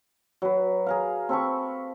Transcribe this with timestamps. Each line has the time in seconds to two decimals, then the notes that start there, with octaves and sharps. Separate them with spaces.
0.42 F#3 B4
0.86 G#4 A#4 F5
1.29 C4 A4 B5 C#6